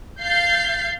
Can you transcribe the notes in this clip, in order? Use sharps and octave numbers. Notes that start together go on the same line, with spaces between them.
F5 G6 A6 C7